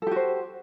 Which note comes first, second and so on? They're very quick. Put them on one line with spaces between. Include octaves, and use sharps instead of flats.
A4 G4 F#4 C5